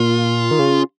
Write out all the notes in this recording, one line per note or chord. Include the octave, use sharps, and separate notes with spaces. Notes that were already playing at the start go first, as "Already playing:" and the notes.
Already playing: A#2 F4
D#3
C#3